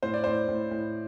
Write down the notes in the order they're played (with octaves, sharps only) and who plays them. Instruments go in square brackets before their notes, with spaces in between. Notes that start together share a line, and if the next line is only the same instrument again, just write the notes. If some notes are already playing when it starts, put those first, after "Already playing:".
[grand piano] A2 C5
D5
A2 C5
A2
A2